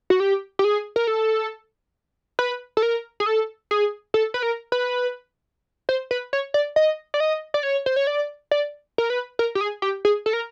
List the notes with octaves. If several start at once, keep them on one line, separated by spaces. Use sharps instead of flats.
F#4
G4
G4
G#4
A#4
A4
B4
A4
A#4
G#4
A4
G#4
A4
B4
A#4
B4
C5
B4
C#5
D5
D#5
D5
D#5
D5
C#5
C5
C#5
D5
D5
A#4
B4
A#4
G4
G#4
G4
G#4
A4
A#4